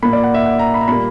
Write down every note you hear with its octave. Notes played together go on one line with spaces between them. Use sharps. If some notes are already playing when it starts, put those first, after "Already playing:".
A#2 A#3 B5
D5
F#5
E5
F#5
A#5
B5
A#5
A#2 G3 A#3 B5